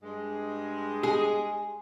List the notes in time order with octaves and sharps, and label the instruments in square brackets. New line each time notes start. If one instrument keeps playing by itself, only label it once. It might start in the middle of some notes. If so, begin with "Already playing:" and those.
[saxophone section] G2 G#3
[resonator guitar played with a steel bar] G#4